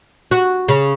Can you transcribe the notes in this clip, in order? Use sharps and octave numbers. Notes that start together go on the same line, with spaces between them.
F#4
C#3